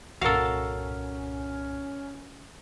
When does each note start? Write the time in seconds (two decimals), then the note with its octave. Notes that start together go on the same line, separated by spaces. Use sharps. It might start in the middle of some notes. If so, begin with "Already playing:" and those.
0.21 C2 G2 A#2 C#4 F#4 A4 A#4 F5